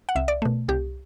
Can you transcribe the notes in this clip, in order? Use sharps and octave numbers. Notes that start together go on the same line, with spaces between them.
F#5
C2 E5
D5
B2 A3
C2 G4